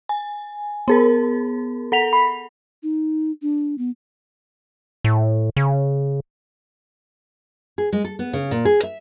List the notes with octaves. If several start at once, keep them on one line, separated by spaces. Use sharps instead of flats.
G#5
B3 G#4 A#4
A4 F#5 B6 F7
B5
D#4
D4
B3
A2
C#3
G#4
G#3
A4
B3
C#3
A#2
G#4
E5